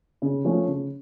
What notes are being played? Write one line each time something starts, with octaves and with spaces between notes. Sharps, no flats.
C#3
F3 A3 C#4
C#3